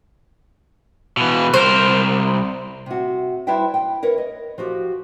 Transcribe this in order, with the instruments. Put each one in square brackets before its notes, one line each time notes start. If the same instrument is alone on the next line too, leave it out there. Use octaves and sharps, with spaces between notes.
[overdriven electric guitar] B2 E3
[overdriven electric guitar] C2 A#4 [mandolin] C5
[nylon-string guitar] C3 F#4
G3 E4 B4 C5 E5 G5
G5
A#4 B4 C#5
D#5
F3 F#4 G4